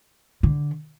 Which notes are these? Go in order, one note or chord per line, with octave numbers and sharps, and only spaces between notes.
D3